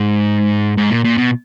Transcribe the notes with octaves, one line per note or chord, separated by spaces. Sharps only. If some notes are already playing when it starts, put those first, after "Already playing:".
Already playing: G#2
G#2
A#2
A#2
B2